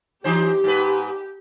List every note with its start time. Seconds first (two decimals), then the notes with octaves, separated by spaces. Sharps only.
0.24 E3 D#4 G4 C5
0.64 G#2 B4